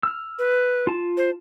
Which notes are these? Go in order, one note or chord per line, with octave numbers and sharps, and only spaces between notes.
E6 F6
B4
F4 A5
C5